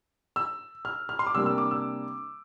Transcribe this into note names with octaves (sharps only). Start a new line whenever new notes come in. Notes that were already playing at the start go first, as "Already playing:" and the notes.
E6
F6
F6
C6
D6
C3 G3 A#3 D4 E6
E6
D6
E6